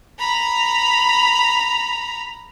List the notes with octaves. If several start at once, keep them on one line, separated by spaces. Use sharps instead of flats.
A#5 B5